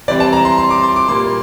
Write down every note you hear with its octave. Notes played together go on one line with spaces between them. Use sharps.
E3 G3 C4 D5
A5
A#5
C6
C6
D6
C6
D6
A#2 G3 A#3 C6